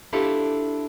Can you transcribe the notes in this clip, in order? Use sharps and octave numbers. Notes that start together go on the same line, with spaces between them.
D4 E4 F4 G4 A4